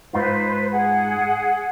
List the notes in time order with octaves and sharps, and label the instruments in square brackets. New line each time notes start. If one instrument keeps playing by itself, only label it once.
[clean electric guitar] G#2 D#4 F4 [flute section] B4 C5
[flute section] G#4 F#5